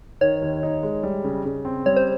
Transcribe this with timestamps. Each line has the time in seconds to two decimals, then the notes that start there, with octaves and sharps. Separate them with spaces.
0.21 D#3 C#5
0.42 D#2
0.63 D#4
0.83 G#3
1.03 G3
1.24 C#3
1.45 C#3
1.65 C4
1.86 G3 C#5
1.96 C5